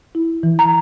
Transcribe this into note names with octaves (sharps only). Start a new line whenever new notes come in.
E4
E3
A#5